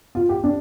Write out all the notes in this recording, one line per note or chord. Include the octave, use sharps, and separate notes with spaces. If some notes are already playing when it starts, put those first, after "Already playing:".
F4
G4
D4